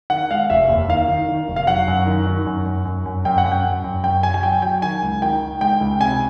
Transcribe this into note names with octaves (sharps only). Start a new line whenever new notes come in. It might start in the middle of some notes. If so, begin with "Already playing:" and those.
D#3 F#5
G#3 F5
F1 E5
D#2
D#3 F5
D#3
D#3
F1
F5
F#3 F#5
F#2
D#3
D#3
F#2
F#2
F#2
F#2
F#2 G5
F#5
F#2
G5
F#2
F#2
F#2 G5
F#3 G#5
G#5
F#3 G5
F#3 G5
D#3 G#5
C#2
D#3 G5
D#3
G#3 G5
C#2
C3 G#5